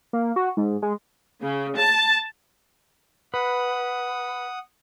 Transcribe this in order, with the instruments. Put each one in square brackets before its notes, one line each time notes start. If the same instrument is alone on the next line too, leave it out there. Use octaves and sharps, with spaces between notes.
[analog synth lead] A#3
F#4
G#2
G#3
[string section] C#3
A5
[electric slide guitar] B4 [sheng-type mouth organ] F#5 D#6